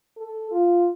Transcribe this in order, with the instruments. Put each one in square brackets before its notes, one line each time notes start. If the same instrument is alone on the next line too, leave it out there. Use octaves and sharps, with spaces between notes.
[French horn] A4
F4